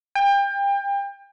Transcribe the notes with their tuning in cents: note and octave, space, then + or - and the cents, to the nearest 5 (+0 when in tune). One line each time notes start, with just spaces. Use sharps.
G5 +30